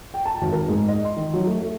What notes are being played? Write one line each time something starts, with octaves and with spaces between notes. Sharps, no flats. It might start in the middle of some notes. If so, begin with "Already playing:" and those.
G5
A5
G#1
A#4
G#2
D#5
C6
D#3
F#3
A3
A3